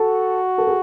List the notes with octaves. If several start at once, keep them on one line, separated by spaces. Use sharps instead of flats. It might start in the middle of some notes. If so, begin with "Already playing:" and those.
Already playing: F#4 A4
A4
G#4